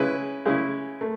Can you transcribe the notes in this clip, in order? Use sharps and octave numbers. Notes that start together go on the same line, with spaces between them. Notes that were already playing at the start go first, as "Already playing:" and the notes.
Already playing: C#3 G#3 C#4 E4 B4
C#3 G#3 C#4 E4
A3